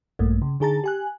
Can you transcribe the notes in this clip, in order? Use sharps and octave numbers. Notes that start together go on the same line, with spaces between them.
A#1 G2 A3 A#3
C#3
D3 D#4 G#4 A5 A#5 A6
G4 G#5 F#6